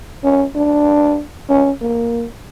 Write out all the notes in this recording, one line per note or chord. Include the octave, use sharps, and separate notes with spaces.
C#4
D4
C#4
A#3